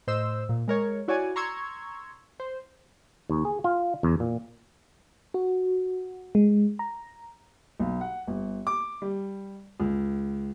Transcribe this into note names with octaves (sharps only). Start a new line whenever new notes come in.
A2 C5 D#5 E6
A#2
G#3 A#4 C#5
E4 F#4 C#5 D5 G#5
A#5 C6 C#6 E6 G#6
C5
D#2
G#4
F4
E2
A#2
F#4
G#3
A#5
B1
F#5
G1
D6
G3
C#2